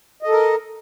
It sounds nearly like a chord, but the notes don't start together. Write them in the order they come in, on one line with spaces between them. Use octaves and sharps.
D#5 A4 A#4